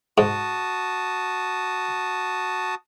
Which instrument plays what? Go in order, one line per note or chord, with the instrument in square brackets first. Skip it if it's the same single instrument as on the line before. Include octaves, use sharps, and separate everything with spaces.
[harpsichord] G#2 [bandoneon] F#4 A5 D#6